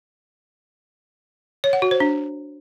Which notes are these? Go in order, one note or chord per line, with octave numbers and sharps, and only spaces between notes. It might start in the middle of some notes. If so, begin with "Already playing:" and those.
C#5
F#5
F#4
C5
D4